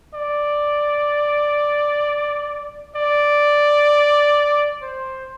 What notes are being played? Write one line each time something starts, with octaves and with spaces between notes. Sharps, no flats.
D5
D5
C5